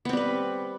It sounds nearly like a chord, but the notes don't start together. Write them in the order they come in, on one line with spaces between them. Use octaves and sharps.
B3 C4 G3 B4